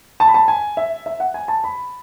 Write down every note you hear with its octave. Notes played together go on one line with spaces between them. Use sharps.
A5
B5
A5
G#5
E5
E5
F#5
G#5
A5
B5